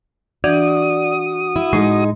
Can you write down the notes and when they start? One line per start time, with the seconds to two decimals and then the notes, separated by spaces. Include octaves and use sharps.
0.44 E3 D4 F#4 D5 D#6 G6
1.56 E4
1.73 A2 G#3 D#4